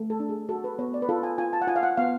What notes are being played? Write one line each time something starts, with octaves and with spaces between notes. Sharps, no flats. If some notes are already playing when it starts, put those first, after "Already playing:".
Already playing: A3
A4
D4
G#4
F#4 A4
B4
B3 C#5
D5
B4
F4 A4
G#5
F4 G#5
A5
F#5
F4 G#5
F5
F#5
B3 F5